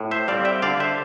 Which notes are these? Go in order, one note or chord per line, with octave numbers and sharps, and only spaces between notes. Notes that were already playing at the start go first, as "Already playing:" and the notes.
Already playing: A2
C5 E5
G3 C4 D5 F5
E5 G5
D3 D5 F5
C5 E5